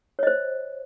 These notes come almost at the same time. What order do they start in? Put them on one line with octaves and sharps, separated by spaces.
C#5 D#5 C5